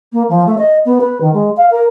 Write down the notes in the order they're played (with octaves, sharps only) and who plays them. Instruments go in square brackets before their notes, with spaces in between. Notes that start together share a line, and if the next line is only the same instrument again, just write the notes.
[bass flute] A#3
F3
A3
D#5
B3
B4
D#3
G#3
F5
A#4